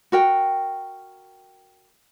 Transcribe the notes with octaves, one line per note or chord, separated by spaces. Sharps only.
F#4 A#4 G5